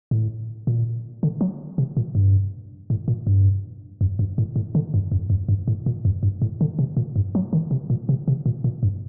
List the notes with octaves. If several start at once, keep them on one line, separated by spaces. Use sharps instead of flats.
A2
A#2
D3
F#3
C3
A#2
G2
A2
A#2
G2
F#2
G2
A2
A2
D3
G2
F#2
F#2
G2
A2
A#2
F#2
G2
A2
D3
C3
A#2
G2
F#3
D#3
C3
A#2
C3
C3
A#2
A#2
G2